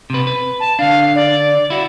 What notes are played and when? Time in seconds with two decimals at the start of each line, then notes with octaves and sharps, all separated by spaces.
0.10 C3 B4
0.27 B4
0.60 A5
0.79 D3 D4 F5
1.15 D5
1.70 E4 F#4